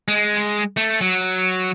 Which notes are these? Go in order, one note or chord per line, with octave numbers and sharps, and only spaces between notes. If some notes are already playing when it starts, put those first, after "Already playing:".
G#3
A3
F#3